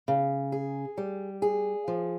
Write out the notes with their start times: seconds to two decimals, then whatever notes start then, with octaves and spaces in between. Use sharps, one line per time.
0.08 C#3
0.52 G#4
0.98 G3
1.42 G#4
1.88 F3